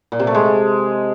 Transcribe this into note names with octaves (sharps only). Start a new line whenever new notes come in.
A#2
C3
A3
G#3